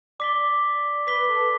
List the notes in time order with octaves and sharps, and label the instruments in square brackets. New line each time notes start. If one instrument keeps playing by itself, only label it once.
[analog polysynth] D5 [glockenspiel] D6 B6 G7
[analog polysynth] B4 [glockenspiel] D6 B6 G7
[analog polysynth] A4